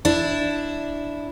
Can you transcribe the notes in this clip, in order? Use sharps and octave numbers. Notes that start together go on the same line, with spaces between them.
D4 E4